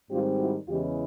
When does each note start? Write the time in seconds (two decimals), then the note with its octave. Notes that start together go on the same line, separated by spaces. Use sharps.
0.10 G#2 D#3 G3 C4 F4 G4
0.39 E4 F#4
0.68 E2 C#3 E3 G#3 F4 G4